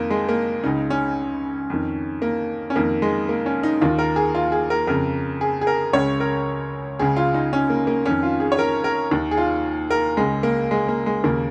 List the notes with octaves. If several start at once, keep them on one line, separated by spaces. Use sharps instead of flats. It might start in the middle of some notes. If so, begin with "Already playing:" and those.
Already playing: F2 D#3 A#3
G#3
A#3
C#2 C#3 D#4
C#4
F2 D#3
A#3
C#4
F2 D#3 A#3
G#3
A#3
C#4
D#4
D#2 D#3 F4
A#4
G#4
F4
G#4
A#4
F2 C#3 A#4
G#4
G#4
A#4
C#2 C#3 C#5
A#4
C#2 C#3 G#4
F4
D#4
C#4
A#3
A#3
F2 D#3 C#4
F4
G#4
C#5
A#4
A#4
D#2 D#3
G#4
F4
A#4
C#2 C#3 G#3
A#3
G#3
A#3
G#3
D#2 C#3 A#3